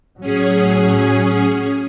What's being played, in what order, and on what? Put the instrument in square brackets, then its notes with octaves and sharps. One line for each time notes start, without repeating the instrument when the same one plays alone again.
[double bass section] A2 F#3 [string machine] C#4 G#4